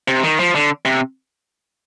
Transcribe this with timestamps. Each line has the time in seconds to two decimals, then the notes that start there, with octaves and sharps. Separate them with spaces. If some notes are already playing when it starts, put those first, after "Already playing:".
0.08 C3
0.23 D#3
0.39 F3
0.55 D3
0.85 C3